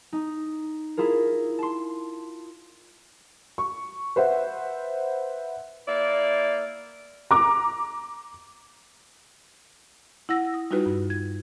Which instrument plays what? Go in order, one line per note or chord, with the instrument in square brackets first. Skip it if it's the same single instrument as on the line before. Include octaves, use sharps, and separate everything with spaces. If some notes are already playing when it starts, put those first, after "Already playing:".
[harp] D#4
E4 F4 G#4 A#4
A5 C6
[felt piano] C#6
B4 C5 E5 F#5
[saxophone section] A#3 E4 D5
[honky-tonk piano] A#5 D6
[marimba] E4 F#5 E6 A#6
D#6
G3 D#4 F4 F#4 B4
G2
G#6